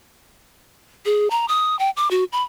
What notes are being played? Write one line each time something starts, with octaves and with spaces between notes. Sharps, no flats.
G#4
A#5
D#6
G5
D6
F#4
B5